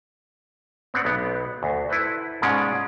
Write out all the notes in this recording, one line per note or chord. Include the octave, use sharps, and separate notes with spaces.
B3 C4 D4 F#5
B1 B3
D2
E4 A4 B4 C5
G#2 B2 G#3 C#4 F4 D5